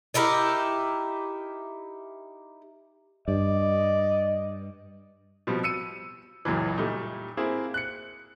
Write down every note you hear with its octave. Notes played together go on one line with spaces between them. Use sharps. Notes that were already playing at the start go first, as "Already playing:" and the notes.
D#4 E4 G4 A#4
G2 D5 D#5
B2 F3 G3 C4
E6 C#7 D#7
C#2 F#2 A#2 C#3 E3
A#2 G3 A3 D#4
A#3 C4 E4 G#4
F#6 C#7